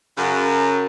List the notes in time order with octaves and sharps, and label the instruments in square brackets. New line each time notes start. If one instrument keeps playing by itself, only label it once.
[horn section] F#2 C#3